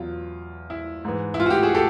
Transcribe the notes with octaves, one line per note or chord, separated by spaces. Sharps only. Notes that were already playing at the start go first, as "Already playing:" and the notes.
Already playing: E2 B2 F#3 F4
E4
G#2 E3
E4
F4
F#4
F4 G4
F#4 G#4
G4 A4